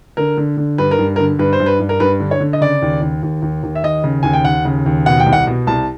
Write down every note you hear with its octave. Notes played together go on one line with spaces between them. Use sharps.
D3 A#4
D3
D3
G2 B4
A#4
G2
A#4
D3
G2 B4
C5
G2
B4
G2
A#4
G2 B4
D3
C#5
D3
D#5
C#3 D5
D#2
D#2
D#2
D#2
D#2
E5
D#2 D#5
C#3
D#2 G#5
G5
D#2 F#5
C#3
D#2
B2 F#5
G5
C2
F#5
B2
C2 A5